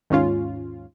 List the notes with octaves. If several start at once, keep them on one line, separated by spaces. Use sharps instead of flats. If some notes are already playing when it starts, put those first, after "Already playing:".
D#2 G#2 C#4 F4